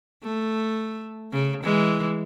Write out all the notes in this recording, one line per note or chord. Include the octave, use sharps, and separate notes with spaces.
A3
C#3
E3 G#3